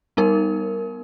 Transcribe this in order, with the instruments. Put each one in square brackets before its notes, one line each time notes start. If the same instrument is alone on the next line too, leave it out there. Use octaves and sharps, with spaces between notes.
[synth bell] G3 B3 D#4 A#4